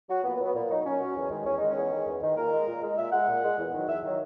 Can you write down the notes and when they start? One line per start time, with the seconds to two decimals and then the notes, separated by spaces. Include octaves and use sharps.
0.09 F#3 F#4
0.24 A#2 B3
0.34 B3
0.39 F#3
0.44 B3
0.54 A#2
0.70 F#3 D#4
0.84 A#2 C#4
0.99 F#3
1.15 E2
1.30 D#3 G#3
1.45 E2 C#4
1.57 D#3 G#3 D#4
1.70 C#4
1.75 E2
1.90 D#3 G#3
2.06 E2
2.21 D#3 G#3
2.36 A#2 A#4
2.52 G#3
2.67 A#2
2.82 G#3
2.97 A#2 E5
3.12 G#3 F#5
3.28 A#2
3.43 G#3
3.58 E2
3.73 D#3 F#3
3.88 E2 E5
4.03 D#3 F#3